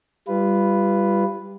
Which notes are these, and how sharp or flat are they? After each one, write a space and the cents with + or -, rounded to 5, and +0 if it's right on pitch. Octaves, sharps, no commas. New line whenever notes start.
G3 +10 F4 -25 B4 +0